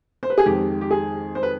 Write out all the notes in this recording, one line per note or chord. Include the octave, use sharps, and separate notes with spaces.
C5
B4
G#4
F2 D#3 G#3 G4
G4
G#4
C5
B4